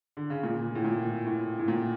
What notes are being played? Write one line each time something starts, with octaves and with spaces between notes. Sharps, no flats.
D3
C#3
A#2
A2
A#2
A2
A2
A#2